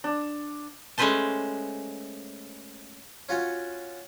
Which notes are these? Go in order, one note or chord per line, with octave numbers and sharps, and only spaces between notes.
D4
G#3 A3 C#4 B4 C5 A5
C#4 F4 F#4 C#5